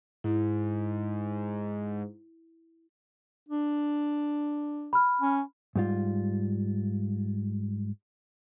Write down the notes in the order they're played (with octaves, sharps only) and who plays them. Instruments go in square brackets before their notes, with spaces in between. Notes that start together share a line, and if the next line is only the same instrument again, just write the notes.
[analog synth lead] G#2 [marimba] E4
[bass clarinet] D4
[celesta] B5 F6
[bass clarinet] C#4
[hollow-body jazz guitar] G#2 G3 F4